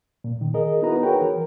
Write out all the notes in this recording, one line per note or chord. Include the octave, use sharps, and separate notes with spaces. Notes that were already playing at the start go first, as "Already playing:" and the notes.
A#2
D#3
G#4 A#4 D#5
B3 D#4 E4 F#4 B4 A#5
F#4 G#4 A#4 B4 C#5 G5
E3 A#4